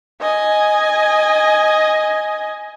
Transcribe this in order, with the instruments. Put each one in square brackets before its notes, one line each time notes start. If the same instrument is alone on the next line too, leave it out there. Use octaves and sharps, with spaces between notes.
[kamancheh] D#5 G#5